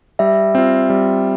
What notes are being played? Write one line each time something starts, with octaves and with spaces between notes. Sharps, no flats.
G3 E5
C4 F4
G3